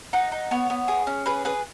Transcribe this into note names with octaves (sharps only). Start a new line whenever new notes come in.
D#4 F#5
D#4
B3 C#5
B3
G#4
C#4
G#4 B4
G#4 B4